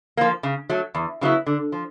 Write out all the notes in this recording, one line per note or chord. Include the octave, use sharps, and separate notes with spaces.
F3 A#3
C#3
F#3 A3
E2
C#3 F#3 B3 E4
D3
F3